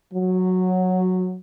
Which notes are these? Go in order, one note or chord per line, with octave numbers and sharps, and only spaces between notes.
F#3